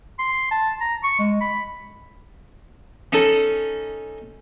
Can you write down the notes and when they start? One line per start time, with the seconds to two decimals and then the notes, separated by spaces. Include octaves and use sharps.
0.19 C6
0.51 A5
0.81 A#5
1.03 C#6
1.19 G#3
1.41 B5
3.12 C#4 D#4 A4